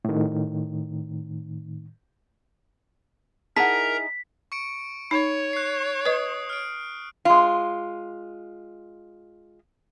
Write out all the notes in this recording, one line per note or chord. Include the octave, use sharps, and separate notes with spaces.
A2 D#3
D#4 E4 G#4 A#4 F#5 A5 A#5 B6
C#6 C#7 D7
D#4 C#5
F#6 C7
B4 D#5 D#6
F6 D7
G#3 F4